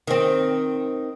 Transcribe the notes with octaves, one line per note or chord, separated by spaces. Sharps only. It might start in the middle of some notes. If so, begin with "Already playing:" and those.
D#3 C4